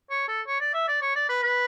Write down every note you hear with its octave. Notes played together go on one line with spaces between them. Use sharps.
C#5
A4
C#5
D5
E5
D5
C#5
D5
B4
B4